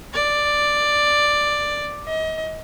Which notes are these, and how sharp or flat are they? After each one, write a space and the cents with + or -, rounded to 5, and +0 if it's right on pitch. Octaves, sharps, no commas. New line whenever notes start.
D5 +5
D#5 +30